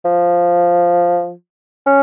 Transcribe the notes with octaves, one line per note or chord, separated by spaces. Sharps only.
F3
C#4